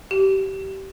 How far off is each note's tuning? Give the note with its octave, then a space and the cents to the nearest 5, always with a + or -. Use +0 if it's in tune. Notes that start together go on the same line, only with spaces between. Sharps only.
G4 -25